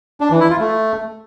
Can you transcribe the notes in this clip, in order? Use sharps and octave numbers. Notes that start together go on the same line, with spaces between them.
D4
E3
E4
F4
A3